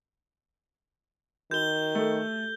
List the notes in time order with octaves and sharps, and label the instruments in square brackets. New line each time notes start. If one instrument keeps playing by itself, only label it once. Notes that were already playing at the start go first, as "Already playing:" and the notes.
[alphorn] D#3 [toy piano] F#4 A#4 [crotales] G6 G7
[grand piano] A3 [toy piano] G4 A4